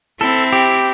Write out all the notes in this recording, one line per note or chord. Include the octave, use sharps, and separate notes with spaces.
C4 E4 A4
G4